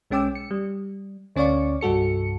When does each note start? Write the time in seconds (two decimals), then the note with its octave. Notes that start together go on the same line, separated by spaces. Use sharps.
0.11 B1 G#3 C#4 G5 D6 E6
0.35 C#7
0.51 G3
1.36 D2 C#4 C#5 D5 F5 C#6
1.81 C2 G2 F#4 A4 C#7